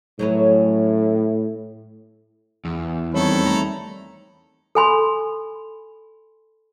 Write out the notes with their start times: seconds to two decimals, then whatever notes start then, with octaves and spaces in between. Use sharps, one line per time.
0.19 A2 F#3 C#4 B4
2.65 E2
3.14 D#3 G3 C4 A4 C#5 B5
3.47 A3 A#5
4.75 A4 G#5 B5 C6